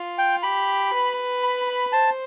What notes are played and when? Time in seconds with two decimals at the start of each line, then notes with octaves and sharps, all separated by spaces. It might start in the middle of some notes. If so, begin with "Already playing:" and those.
Already playing: F4
0.18 G5
0.43 G4 B5
0.93 B4
1.43 B5
1.68 B5
1.92 C5 A5